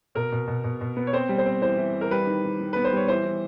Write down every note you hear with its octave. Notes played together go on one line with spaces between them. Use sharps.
B2 A#4
B2
B2
B2
B2
B3
C#5
C4 C5
G3
C5
C4
E3 C5
E3
E3
A#4
G3 B4
D#3
D#3
D#3
B3 B4
C5
G3 C#5
E3 C5
E3